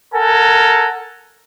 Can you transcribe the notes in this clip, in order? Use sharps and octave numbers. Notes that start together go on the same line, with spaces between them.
A4 A#4 F#5 G#5 A#5